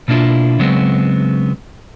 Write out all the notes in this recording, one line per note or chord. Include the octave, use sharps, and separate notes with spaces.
B2 A#3 D4 E4 F4
C#3 F#3 G#3 B3 C4